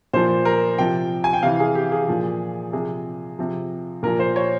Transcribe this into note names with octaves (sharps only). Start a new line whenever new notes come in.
A#2 F3 C5
A#4
C3 F3 G5
G#5
G5
C3 E3 F5
G#4
G4
G#4
A#2 F3
C3 F3 G#4
C3 F3
A#2 F3 A#4
C5
C#5